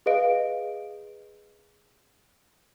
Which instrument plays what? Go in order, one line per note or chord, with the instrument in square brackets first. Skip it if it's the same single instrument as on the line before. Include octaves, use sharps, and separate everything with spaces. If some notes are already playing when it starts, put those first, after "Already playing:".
[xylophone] G#4 B4 D#5 F5 D7